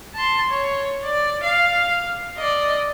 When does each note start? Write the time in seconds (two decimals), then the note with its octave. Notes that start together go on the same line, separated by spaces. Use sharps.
0.14 A5 C6
0.50 C#5
1.04 D5
1.43 F5
2.38 D5 D#5